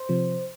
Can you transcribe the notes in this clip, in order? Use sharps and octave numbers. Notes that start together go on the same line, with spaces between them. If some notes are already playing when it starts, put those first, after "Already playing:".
Already playing: C5
C3 F3